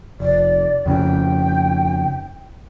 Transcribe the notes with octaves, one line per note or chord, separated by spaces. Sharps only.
F1 D5
F2 C#3 C#4 G5